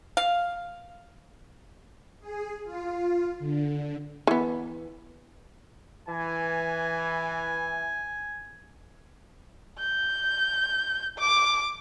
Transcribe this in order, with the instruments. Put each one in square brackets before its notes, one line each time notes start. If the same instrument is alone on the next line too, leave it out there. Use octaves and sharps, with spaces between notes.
[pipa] F5
[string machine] G#4
F4
D3
[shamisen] E3 B3
[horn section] E3 [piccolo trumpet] G#5
[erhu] G6
D6